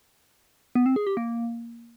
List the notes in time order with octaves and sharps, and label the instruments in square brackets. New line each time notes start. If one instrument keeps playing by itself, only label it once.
[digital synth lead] B3
C4
G#4
G4
A#3